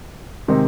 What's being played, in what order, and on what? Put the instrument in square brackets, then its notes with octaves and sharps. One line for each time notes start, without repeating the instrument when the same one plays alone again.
[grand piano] C3 D#3 G#3 C4 D#4